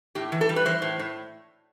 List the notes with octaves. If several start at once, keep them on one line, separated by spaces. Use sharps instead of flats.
A2 G4
E3
A4
G3
B4
E3 C5
A2
A2